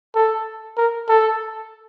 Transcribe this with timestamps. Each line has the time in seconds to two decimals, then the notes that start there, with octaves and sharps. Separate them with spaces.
0.15 A4
0.77 A#4
1.09 A4